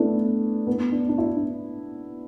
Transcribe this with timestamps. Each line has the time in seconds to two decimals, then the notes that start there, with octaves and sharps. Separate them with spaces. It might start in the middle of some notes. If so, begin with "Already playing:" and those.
Already playing: A3 B3 D4 E4
0.67 B3
0.92 D4
1.09 D4
1.18 E4
1.36 D4